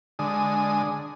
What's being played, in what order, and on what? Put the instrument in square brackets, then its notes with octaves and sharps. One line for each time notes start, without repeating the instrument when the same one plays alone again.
[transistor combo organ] D3 G#3 D#6